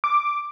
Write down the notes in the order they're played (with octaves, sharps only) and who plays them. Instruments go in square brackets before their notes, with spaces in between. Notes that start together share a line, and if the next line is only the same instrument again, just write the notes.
[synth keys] D6